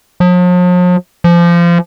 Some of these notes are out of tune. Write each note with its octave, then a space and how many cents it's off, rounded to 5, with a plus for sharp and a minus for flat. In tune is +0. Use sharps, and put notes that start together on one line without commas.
F3 +45
F3 -25